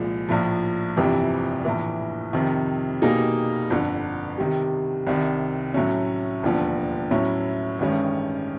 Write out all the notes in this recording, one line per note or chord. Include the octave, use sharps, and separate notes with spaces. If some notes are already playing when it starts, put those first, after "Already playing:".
Already playing: C2 A#2 F3 G#3
A#1 A2 F3
G1 F2 C3 E3 G3
A#1 A2 E3
F2 C3 D#3
B2 G3 A#3 D#4 G#4
G1 F2 D3
C3 D#3 G3
C2 C3 D#3
A2 F#3 A3 C#4
E1 D#2 D3 F3
A2 F#3 A3 C#4 E4
A1 G2 D#3 G#3 C#4